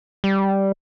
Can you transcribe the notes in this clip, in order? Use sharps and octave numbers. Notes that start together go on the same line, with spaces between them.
G3